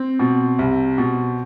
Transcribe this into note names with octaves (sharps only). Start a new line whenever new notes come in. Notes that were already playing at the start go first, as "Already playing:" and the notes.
Already playing: C4
B2
C2
B2